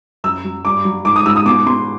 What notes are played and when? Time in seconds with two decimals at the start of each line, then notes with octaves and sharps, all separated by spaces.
0.24 F#2 E6
0.44 F#3
0.65 G2 D6
0.85 F#3
1.05 G#2 D6
1.16 D#6
1.25 G#2 E6
1.36 D#6
1.46 B2 D6
1.66 B2 C6